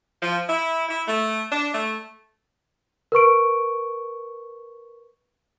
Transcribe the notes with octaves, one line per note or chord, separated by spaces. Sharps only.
F3
E4
E4
A3
D4
A3
A#4 B4 C#6 D7